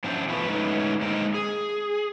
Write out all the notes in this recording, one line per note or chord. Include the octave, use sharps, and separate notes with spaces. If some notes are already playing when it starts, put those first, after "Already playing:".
F3 F#3 C#4 D4 E4 C5
F3 A3 B3 C#4 B4
F#3 G#3 A3 C#4 D#4 B4
D3 G#3 A#3 C4 D#4 A#4
G#4